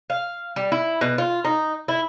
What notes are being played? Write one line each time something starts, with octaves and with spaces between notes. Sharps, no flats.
F5
G3
E4
B2
F4
D#4
E4